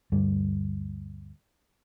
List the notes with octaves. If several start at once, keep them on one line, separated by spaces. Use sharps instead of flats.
D2 G2 G3